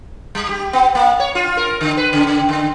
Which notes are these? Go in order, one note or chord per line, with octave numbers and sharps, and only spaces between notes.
G3
G4
B3
A#3
C#5
F4
A#4
D3
B4
C#3
C#3
D3